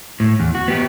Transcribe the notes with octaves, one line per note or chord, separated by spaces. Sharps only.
A2
E2
F#4
B3 G4